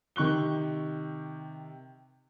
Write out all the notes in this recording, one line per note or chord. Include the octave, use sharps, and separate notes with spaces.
C3 D#3 C#6 F#6 G7